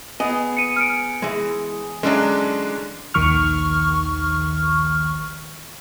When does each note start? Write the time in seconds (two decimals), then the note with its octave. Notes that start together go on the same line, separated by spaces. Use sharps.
0.20 B3 G#4 D#5
0.57 C#7 D#7
0.76 F6 C#7 D7
1.22 E3 G#3
2.03 D3 E3 F#3 G#3 C#4 D4
3.14 A#1 D#2 D#3 C#6 F6